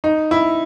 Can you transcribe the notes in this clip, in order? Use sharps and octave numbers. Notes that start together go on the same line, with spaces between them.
D#4
E4